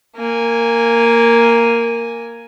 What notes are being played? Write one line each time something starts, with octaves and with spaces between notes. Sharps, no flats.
A#3 G#5